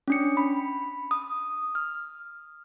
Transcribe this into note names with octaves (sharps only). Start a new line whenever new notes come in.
C#4 D4 C#7
B5
D#6
F6